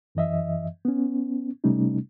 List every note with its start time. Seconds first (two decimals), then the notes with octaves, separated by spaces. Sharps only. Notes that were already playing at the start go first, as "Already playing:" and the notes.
0.15 F#2 E3 D#5 E5
0.85 B3 C#4
1.64 C3 G3 A3 C#4 D#4